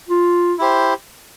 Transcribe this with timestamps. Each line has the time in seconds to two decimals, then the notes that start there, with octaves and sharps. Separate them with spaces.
0.09 F4
0.59 E4 G4 C5